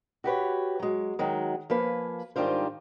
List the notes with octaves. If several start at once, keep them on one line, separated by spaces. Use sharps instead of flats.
F#4 G4 B4 C#5
F#3 G#3
D#3 F#3 G#3
F3 A#3 B4 G#5
G#2 D#3 G3 D4 F4 C5